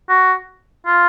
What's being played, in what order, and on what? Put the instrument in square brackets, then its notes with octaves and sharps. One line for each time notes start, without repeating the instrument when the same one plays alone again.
[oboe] F#4
F4